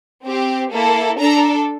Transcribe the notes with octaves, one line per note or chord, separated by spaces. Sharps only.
C4 G4
A#3 E4 A4
D4 A4 A#5